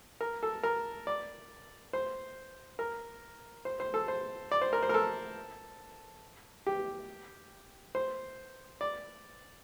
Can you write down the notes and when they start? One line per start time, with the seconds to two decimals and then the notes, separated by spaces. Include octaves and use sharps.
0.21 A#4
0.43 A4
0.63 A#4
1.07 D5
1.93 C5
2.79 A#4
3.65 C5
3.80 C5
3.94 A4
4.08 C5
4.51 D5
4.61 C5
4.73 A#4
4.83 C5
4.89 A#4
4.94 A4
6.67 G4
7.95 C5
8.81 D5